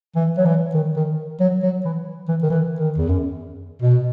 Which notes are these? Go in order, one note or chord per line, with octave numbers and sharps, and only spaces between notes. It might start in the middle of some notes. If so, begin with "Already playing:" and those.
E3
F#3
E3
D#3
D#3
F#3
F#3
E3
E3
D#3
E3
D#3
E2
F#2
B2